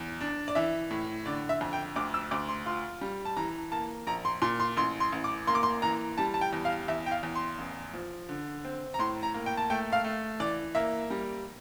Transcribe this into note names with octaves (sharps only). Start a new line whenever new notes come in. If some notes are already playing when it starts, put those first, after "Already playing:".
Already playing: E2
D4
D5
E3 E5
A2
D3 D5
E5
F2
G5
D2 D6
E6
D2 D6
C6
F4 C6
G3
A5
E3 A#5
A#3 A5
A#1 A#5
C6
A#2 C6
C6
A1 C6
C6
A1
D6
A#3 C6
D6
C6
E3 A#5
G3 A5
A5
G5
E2
F5
E2 E5
G5
F5
E2
C6
A1
F3
D3
C4
A#5
A2 C6
A#5
A#3
G5
A5
A3 G5
F5
A3
E3 D5
A#3 E5
G3